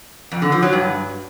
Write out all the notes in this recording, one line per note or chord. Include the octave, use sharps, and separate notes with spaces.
F2
D3
F3
F#3
G2